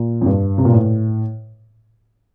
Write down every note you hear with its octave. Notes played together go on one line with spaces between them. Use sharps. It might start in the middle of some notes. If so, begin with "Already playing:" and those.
Already playing: A#2
F2
G2
C3
A#2
A2